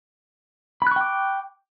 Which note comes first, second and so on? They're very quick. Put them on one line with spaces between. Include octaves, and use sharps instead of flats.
B5 F#6 C#6 G5 D6